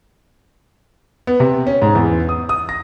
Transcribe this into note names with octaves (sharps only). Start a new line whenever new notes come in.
B3
C3
C#4
G#2
E2
D#6
D#6
A#6